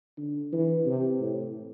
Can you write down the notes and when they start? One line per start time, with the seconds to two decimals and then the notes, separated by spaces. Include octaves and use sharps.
0.18 D3
0.52 E3
0.86 C3
1.20 A2